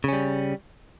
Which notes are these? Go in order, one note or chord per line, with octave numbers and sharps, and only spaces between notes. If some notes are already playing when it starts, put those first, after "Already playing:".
C#3 G3 C#4